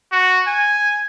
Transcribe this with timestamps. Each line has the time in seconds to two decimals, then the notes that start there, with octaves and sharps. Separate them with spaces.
0.12 F#4
0.47 G#5